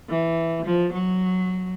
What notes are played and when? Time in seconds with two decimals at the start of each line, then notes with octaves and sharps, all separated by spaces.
0.08 E3
0.66 F3
0.93 F#3